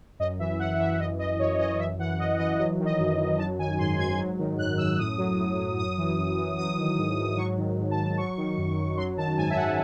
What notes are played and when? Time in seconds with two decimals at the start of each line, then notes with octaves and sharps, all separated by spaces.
0.19 F#2 D#5
0.39 E3 E5
0.59 F#2 F#5
0.79 E3 E5
0.99 F#2 D#5
1.19 E3 D#5
1.39 F#2 C#5
1.59 E3 D#5
1.79 F#2 E5
1.99 E3 F#5
2.19 F#2 D#5
2.39 E3 D#5
2.58 F#3 D#5
2.79 D#3
2.85 D#5
2.99 F#2
3.19 F#2
3.38 F#3 A5
3.59 D#3 G#5
3.79 G#2 C6
3.98 G#2 G#6
4.18 F#3
4.39 D#3
4.58 F#2 F#6
4.78 F#2 E6
4.98 A2 D#6
5.18 F#3
5.38 A2
5.58 F#3
5.78 F#2 D#6
5.98 E3
6.18 F#2
6.38 E3
6.58 F#3 D#6
6.78 D#3
6.98 G#2
7.17 G#2
7.37 F#3 C#6
7.57 D#3
7.78 G#2
7.91 A5
7.98 G#2
8.18 F#3 C#6
8.37 D#3
8.57 F#2
8.77 F#2
8.97 F#3 C6
9.17 D#3 A5
9.37 G#2 G#5
9.50 E5
9.57 G#2 F#5